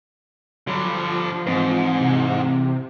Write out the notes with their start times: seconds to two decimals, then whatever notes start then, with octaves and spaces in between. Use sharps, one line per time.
0.67 D3 F#3 G3
0.85 F3
1.47 G#2 E3 C4 C5
2.01 C3